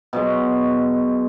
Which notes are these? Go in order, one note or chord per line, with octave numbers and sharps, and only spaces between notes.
B2 F#3 G#3